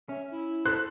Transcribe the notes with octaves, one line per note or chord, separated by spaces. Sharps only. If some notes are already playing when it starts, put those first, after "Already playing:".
C#4 E5
E4
A4 C5 F#6